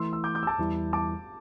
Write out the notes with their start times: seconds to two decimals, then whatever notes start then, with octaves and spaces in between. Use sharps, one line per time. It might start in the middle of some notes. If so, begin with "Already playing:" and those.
Already playing: E3 A3 E4 C6 E6
0.13 E6
0.24 D6 G6
0.35 D6 G6
0.43 E6
0.47 A5 D6
0.58 E2 E3 G3 E4
0.93 A5 D6